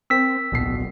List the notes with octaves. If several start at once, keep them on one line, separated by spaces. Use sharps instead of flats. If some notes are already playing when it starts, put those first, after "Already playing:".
C4 A#4 G5 E6 B6
D1 A#1 B2 C7